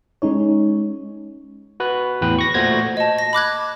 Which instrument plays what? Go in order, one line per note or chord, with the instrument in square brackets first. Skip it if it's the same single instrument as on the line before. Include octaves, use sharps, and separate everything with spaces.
[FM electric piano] G#3 C#4 D#4 C#5
[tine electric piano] F#4 B4
E2 A2 B4 G5
C#6 A#6
A#2 A3 F#4 C5 G#6 A#6
[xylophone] D#5 A5
A#6
B5 D6 F#6 G#6